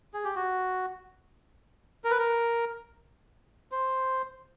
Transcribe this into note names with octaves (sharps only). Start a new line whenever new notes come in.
G#4
G4
F#4
A#4
B4
A#4
C5